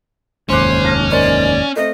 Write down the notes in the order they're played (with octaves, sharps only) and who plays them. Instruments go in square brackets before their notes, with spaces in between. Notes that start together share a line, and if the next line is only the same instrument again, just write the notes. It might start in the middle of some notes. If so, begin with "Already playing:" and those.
[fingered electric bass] F1 D#2 G#2 [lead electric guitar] C#4 [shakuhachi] C5 [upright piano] C6 D6 F#6
[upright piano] A5 F6 A#6
[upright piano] D#4 A#4 C5 [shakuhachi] D5
[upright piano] A3 C4 [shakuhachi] D#5